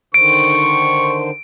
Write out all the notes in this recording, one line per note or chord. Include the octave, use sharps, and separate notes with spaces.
D3 D#3 C5 C#6 D7